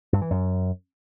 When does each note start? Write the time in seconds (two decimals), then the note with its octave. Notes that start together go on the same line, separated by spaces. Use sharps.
0.13 G2
0.22 E3
0.30 F#2